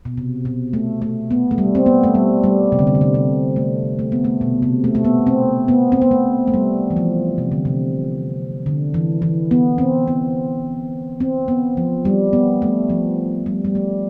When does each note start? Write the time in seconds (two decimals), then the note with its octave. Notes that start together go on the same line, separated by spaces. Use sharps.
0.05 B2
0.17 C3
0.45 B2
0.73 A3
1.02 A3
1.31 B3
1.51 A3
1.58 G3
1.75 C4
1.86 B3
2.03 A3
2.15 G3
2.44 G3
2.72 C3
2.79 D3
2.87 C3
2.95 D3
3.01 C3
3.14 C3
3.56 A3
3.99 A3
4.12 B3
4.25 A3
4.41 B2
4.62 C3
4.84 A3
4.95 A3
5.04 B3
5.27 C4
5.68 B3
5.92 C4
6.02 B3
6.11 A3
6.48 A3
6.54 G3
6.90 E3
6.96 F3
7.38 C3
7.52 D3
7.65 C3
8.66 D3
8.94 E3
9.22 E3
9.51 B3
9.78 C4
10.08 B3
11.20 C4
11.48 B3
11.77 F3
12.05 G3
12.33 B3
12.62 A3
12.90 F3
13.46 G3
13.65 G3
13.75 A3